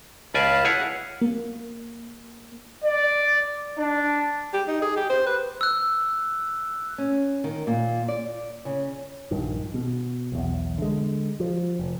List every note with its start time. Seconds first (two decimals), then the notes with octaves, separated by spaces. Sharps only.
0.34 C#2 D5 F5 G#5 A5 B5
0.65 E4 G#4 C#5 F#5
1.22 A#3
2.84 D5
3.78 D4
4.53 G4
4.68 D#4
4.82 G#4
4.97 G4
5.10 C5
5.27 B4
5.61 E6 F#6
6.98 C#4
7.44 D#3
7.67 A#2
8.08 D5
8.65 C#3
9.31 A#1 G2 D#3
9.74 B2
10.32 B1 E2
10.78 D3 G#3
11.40 F3
11.79 F1